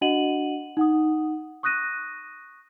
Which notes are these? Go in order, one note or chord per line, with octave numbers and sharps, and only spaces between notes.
D4 F#4 D#5 F#5 D#7 F#7
D#4 F#5 D#6
C#6 D#6 F#6 A#6 D#7